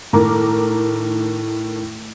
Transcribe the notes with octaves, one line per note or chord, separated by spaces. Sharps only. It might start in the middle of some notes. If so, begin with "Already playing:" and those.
A2 D#3 A#4 A#5 D6